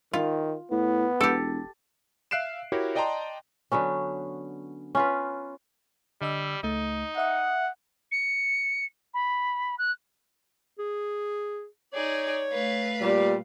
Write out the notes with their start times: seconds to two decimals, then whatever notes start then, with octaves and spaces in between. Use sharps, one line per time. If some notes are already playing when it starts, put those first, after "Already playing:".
0.13 D#3 F4
0.71 A2 B3
1.21 E1 G4 A4
2.31 E5 F5 F#6 C7 D7 E7
2.72 E4 F#4 G4 A#4 C#5
2.95 D5 D#5 G5 A5 A#5 C6
3.72 D3 F#3 B3 C#4
4.95 C#4 F4 B4
6.22 D3 G3 D#5 E6
6.63 C#2 A3 D#4
7.18 E5 F#5 D#6
8.12 C#7
9.14 B5
9.78 F#6
10.79 G#4
11.93 D#4 G#4 C#5 D5
12.50 A3 B4 F5
13.01 A#2 G3